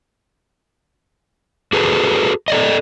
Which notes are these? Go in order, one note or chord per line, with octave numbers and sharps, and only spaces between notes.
F#4 G#4 A4 B4
A4 D5 D#5